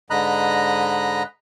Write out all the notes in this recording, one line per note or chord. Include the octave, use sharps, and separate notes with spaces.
G#2 D3 D#5 A#5 B5 F#6